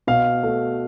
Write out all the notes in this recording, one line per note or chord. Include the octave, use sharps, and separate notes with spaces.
B2 F5
A3